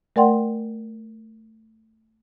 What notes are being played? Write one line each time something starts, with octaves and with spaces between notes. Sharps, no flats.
A3 A#4 D5 F#5 G5 C6